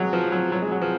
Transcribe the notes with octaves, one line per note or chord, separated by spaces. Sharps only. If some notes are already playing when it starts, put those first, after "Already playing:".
Already playing: F#3 G#3
F3
F#3
F#3
G#3
F#3
F3